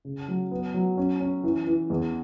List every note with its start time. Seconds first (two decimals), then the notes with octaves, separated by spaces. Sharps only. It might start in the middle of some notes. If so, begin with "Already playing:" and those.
0.05 C#3
0.28 F#3
0.51 B3
0.74 F#3
0.98 C#4
1.20 C#4
1.44 E3
1.67 E3
1.90 E2